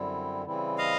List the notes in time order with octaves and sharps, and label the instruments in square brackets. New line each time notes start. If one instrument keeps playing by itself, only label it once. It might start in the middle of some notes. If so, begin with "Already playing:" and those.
Already playing: [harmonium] F#2 D3 G3 C4 E4
C#3 E3 G3 C4 E4
[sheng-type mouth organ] D#5 F5